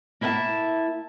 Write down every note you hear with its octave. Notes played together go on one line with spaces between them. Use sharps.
A#3 E4 E5 F#5 A5